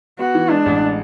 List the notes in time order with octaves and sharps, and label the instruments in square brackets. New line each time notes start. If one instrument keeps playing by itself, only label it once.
[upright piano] B3 [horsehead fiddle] F#4
[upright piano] E3
[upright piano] G#3 [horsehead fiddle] D4
[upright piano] A1